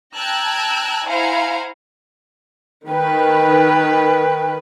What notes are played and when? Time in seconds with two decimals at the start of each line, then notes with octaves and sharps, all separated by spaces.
0.15 G5 A5 A#5 E6 F#6 G#6
1.07 E4 C5 F5 F#5 G#5 A#5
2.87 D#3 B4 G5